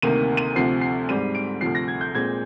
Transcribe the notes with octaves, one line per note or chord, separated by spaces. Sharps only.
D2 C3 D#3 A#3 D#7
D#7
D2 C3 F3 C4 C7
C7
G#2 G3 C4 D#7
D7
D2 C3 F3 C7
A#6
G#6
G6
A#2 G#3 C4 G#6